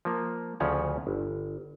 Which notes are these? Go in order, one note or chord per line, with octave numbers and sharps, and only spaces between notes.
F3 A#3
D2 C#3 F3 C#4 C#5 F#5
G1